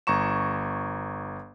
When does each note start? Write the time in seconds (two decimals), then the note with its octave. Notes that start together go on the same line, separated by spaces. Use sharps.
0.07 G1 A#5 C#6 E7